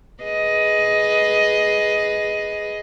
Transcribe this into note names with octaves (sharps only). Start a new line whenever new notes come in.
G#4 B4 D#5